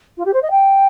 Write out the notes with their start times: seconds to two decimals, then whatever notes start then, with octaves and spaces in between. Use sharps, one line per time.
0.17 F4
0.25 G4
0.33 C5
0.42 D#5
0.50 G5